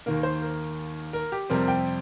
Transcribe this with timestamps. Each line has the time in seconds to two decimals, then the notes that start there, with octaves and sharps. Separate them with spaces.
0.06 D#2 D#3 A#3 A#4
0.19 A#4
0.23 C5
0.42 A#4
1.13 A#4
1.32 G4
1.50 F2 C3 G3 C4 A#4
1.68 G5